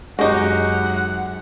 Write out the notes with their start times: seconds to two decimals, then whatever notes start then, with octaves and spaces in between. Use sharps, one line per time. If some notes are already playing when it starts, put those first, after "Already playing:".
0.19 F#2 G#3 D#4 F#4 G4 F#5